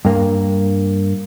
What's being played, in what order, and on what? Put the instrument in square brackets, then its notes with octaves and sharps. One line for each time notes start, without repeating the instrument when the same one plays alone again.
[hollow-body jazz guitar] G2 A#3